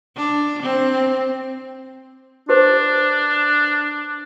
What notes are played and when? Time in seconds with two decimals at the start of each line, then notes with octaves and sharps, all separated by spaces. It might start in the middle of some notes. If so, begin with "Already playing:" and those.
0.16 D4
0.62 C4
2.49 D4 G4 B4 C5